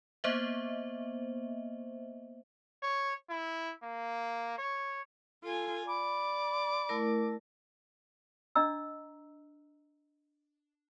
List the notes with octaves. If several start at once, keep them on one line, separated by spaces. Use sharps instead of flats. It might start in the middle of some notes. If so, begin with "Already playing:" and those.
A#3 B3 C5 D#5 E5
C#5
E4
A#3
C#5
F4 A4 G#5
D5 B5 D6
A3 E4 A#4
D4 D#5 A#5 E6